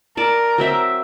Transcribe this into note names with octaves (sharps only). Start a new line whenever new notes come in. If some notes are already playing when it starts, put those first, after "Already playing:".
A#4 D5 A5
F#3 C4 E5